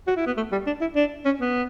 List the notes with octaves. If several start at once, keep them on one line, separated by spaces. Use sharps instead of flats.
F#4
E4
B3
A3
G3
D4
E4
D4
C#4
B3